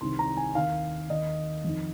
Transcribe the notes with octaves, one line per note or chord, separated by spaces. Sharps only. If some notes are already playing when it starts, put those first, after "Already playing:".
C2 C3 D#3 C6
A#5
G#5
D#2 D#3 F5
D#2 D#3 D#5
F2 D#3